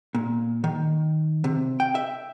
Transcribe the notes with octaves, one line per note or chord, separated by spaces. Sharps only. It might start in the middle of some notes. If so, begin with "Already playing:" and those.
A#2
D#3
C3
G5
E5